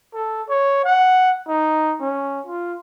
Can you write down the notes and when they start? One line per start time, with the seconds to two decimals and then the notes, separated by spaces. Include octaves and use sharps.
0.14 A4
0.49 C#5
0.85 F#5
1.48 D#4
2.00 C#4
2.46 F4